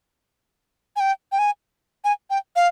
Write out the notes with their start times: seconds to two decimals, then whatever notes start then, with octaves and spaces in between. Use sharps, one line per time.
0.96 G#5
1.00 G5
1.32 G5
1.39 G#5
2.04 G#5
2.30 G5
2.56 F5